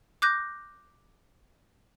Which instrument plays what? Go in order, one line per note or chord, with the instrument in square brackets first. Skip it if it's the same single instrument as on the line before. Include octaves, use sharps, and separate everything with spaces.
[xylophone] D6 F#6 G6 A#6